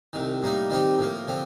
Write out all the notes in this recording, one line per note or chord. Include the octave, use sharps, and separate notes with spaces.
C2 C3 D#3
A2 G3 A#3 D#4
D#3 G3 C4 D#4 G4
A2 F3 A#3
D3 F3 C4